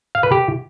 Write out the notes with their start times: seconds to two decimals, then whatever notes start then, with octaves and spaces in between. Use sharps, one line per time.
0.15 F5
0.23 B4
0.32 G4